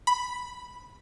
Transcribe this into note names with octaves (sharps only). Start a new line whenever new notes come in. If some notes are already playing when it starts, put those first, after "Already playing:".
B5